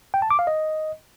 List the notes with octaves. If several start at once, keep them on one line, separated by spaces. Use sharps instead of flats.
G5
A5
D6
F5
D#5